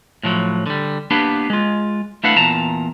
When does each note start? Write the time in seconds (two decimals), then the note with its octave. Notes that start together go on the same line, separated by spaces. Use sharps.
0.23 A2 F3 F#3
0.66 D3 G3
1.11 A#3 B3 D4 G4 B4
1.50 G#3 F4
2.24 A3 D4 E4 B4 F5 F#5
2.37 E2 A#2 A5 A#5